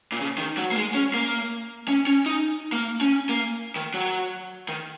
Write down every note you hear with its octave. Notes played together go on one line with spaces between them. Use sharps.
A#2
C#3
D#3
F#3
A#3
G#3
C#4
A#3
C#4
C#4
D#4
A#3
C#4
A#3
D#3
F#3
D#3